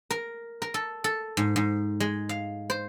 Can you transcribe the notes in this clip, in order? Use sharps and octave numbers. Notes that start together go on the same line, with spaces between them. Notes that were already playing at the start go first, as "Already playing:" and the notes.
A#4
A#4
A4
A4
G#2
G#2
G#3
F5
C5